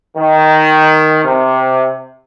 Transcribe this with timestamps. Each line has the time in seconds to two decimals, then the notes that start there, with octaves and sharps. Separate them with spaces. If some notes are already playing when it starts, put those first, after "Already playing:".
0.18 D#3
1.24 C3